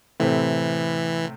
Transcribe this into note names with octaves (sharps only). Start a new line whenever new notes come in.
A2 C3 E3 C4